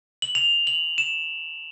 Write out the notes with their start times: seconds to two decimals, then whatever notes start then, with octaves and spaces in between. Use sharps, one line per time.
0.22 F#7
0.35 F7
0.67 F#7
0.98 E7